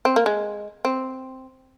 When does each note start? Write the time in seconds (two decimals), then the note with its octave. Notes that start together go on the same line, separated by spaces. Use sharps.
0.05 C4
0.16 A#3
0.26 G#3
0.85 C4